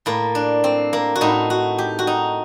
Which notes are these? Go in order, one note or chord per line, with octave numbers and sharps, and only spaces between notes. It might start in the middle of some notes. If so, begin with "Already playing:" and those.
A2 A#3
D4
C4
A#3
F#4
A2 D#4
F#4
G4
F#4
D#4